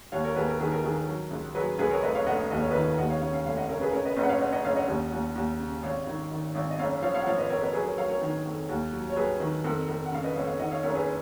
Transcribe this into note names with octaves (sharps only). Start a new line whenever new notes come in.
D#2 C#5 F5
A#4 C#5
D#2 G#4 B4
A#4
D#3 G#4 B4
A#4
D#3 G#4
A#4
F#3
C#2
F#3 G#4 B4
C#2 G#4 B4
A#4 C#5
F1 B4 D#5
C#5 F5
F1 D#5 F#5
D#2 D#5
C#5
D#3 B4 D#5
D#2 D#5 F#5
C#5 F5
C#3 C#5 F5
C#5 F5
F1 C#5 F5
D#5 F#5
C#3 A#4 C#5
G#4 B4
C#3 A#4 C#5
B4 D#5
F#1 B4 D#5
F#5
C#5 F5
C#3 D#5 F#5
D#5 F#5
F#1 C#5 F5
D#5 F#5
D#2
D#2
D#2
C#3
G#1 C#5 F5
D#3
D#3
G#1
D#5
F#1 C#5 F5
F3 C#5 F5
C#5 F5
F#5
F3 C#5 F5
B4 D#5
F2 A#4 C#5
B4 D#5
F#3 G#4 B4
A#4 C#5
F#3 C#5 F5
A#4 C#5
D#3
F2
D#2
F#3
C#5
F#3 G#4 B4
D#3
F2 A#4
F2 A#4
F#5
C#3 F5
B4 D#5
F2 C#5 F5
C#5 F5
D#3 D#5 F#5
C#5 F5
F#1 A#4 C#5
G#4 B4